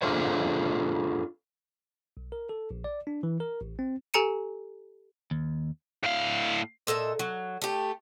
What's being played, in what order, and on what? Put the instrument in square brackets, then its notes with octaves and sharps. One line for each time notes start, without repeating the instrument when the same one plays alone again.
[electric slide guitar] D4 F4 G#4 A4 C5 C#5
[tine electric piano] B1
A#4
A4
A#1
D5
D4
E3
A#4
A1
C4
[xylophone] G4 A4 G#5 A#5 C#7 D#7
[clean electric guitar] D#2
[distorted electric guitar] A2 F5
[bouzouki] A#2 A4 D#5 E5
F#3
A3 G4